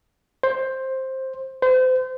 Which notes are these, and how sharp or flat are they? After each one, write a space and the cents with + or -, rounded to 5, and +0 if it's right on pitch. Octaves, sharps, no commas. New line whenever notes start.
C5 +10
C5 -35